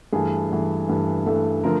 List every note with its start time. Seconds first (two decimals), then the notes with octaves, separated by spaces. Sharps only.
0.13 G2 E3 A3 G#4
0.50 G2 E3 A3
0.88 G2 E3 A3
1.26 G2 E3 A3 A4
1.64 D3 F3 A3 A#4